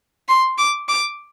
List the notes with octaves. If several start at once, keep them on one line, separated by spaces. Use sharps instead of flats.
C6
D6
D6